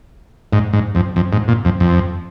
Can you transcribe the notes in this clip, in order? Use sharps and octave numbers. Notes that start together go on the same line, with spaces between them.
G#2
G#2
F2
F2
G#2
A#2
F2
F2